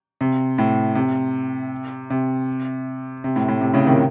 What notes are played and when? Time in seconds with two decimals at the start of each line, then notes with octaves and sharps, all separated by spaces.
0.21 C3
0.58 A2
0.95 C3
2.10 C3
3.24 C3
3.36 A2
3.48 A2
3.61 C3
3.74 A2 C#3
3.86 C3 D#3